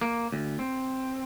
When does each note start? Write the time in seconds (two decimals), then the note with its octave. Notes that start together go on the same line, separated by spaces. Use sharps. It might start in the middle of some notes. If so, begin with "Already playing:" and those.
0.01 A#3
0.32 D2
0.59 C4